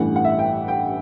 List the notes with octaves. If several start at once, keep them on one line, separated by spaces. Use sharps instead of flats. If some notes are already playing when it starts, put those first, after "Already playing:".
Already playing: A1 G2 E3 A3 F#5
F#5
E5
G5
G5